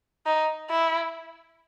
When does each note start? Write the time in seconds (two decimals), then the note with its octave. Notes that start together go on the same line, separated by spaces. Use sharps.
0.26 D#4
0.70 E4